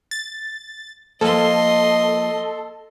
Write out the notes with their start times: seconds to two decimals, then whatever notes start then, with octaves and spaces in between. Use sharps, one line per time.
0.11 A6
1.21 F3 A#3 A4 D#5 C6